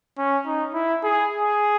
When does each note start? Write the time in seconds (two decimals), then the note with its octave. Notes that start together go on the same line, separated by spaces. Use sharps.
0.18 C#4
0.46 D#4
0.74 E4
1.03 G#4
1.32 G#4